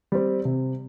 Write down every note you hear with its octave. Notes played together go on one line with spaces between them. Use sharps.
G3 C4
C3